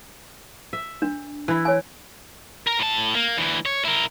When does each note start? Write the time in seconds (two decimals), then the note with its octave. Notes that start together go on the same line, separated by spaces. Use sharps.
0.73 E5
1.02 D4
1.48 E3 E4
1.65 C#5 G#5
2.67 A#4 A#5
2.79 A2 A5
3.14 A#3
3.37 D2 E3
3.66 C#5
3.85 E4 A#4